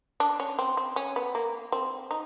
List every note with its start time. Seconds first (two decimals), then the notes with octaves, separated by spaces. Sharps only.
0.20 D4
0.40 C#4
0.59 C4
0.77 C4
0.96 C#4
1.16 B3
1.35 A#3
1.72 C4
2.11 D#4